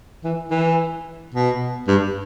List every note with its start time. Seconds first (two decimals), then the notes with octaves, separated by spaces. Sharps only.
0.24 E3
0.51 E3
1.34 B2
1.88 G2